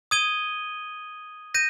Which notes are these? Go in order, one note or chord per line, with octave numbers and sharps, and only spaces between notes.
D#6 G#6 D#7 G7
G6 A#6 D#7